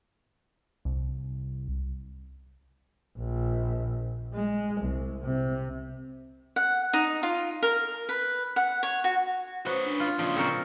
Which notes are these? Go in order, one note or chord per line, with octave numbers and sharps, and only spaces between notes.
C2
A#1
G#3
C2
C3
F#5
D#4
F4
A#4
B4
F#5
C#5
F#4
C#4 F#4 B4 C5 D#6
D4
F4
A#2 C#3 F3 C6 D#6
C4 A#4 C5 C#6 C#7